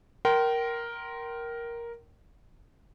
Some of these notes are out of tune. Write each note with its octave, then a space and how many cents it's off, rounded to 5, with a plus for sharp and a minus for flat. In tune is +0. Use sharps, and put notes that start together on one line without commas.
A#4 +5 G5 -30 C6 +0